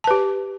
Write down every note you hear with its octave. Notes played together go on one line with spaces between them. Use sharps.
G4 B4 A5